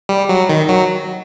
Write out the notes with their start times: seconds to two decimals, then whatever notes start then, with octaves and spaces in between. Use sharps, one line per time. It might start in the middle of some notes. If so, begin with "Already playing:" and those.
0.09 G3
0.29 F#3
0.49 D#3
0.69 F#3